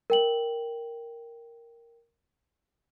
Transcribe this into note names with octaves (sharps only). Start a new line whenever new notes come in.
A#4 G5 F#7